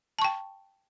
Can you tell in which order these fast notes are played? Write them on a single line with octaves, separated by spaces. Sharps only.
A5 C#6 G5